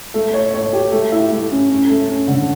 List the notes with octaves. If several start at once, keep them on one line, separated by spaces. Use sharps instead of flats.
A3
C#5
C#5
G4
A3
E4
A3
C#4
C#4
A3
C#4
D3